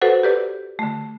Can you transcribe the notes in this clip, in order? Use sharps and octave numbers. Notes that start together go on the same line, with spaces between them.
F#4 A4 B4 C5 F#5
G4 B4 D5
D3 A3